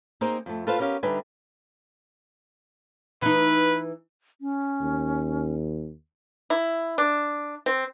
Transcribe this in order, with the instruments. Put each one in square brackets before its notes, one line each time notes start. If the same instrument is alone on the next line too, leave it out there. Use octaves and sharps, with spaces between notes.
[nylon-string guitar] A#3 C4 D#4 G#4 A#4 C5
F2 A3
F4 A4 B4 C5 F5
B3 C#4 G4 A#4 F5
D3 G3 D#4 B4 E5 G#5
[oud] E3 D#4 [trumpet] B4
[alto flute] C#4
[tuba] D#2
[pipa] E4
D4
C4